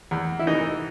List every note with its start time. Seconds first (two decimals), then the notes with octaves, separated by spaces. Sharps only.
0.11 E2
0.39 E4
0.47 E3 D#4